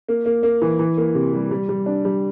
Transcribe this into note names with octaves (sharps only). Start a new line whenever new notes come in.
A#3
A#3
A#3
E3
E3
A#3
C3
G3
G3
G3
D4
G3